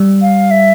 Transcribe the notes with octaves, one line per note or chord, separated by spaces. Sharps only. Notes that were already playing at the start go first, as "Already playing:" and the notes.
Already playing: G3
F5
E5